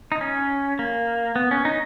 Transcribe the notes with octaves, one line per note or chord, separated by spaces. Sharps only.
D#4
C#4
A#3
B3
C#4
D#4